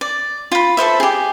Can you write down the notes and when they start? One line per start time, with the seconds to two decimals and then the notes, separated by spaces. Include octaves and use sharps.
0.01 D5
0.52 F4 B5
0.77 A4 B4 C5 E5
1.00 G4 G#4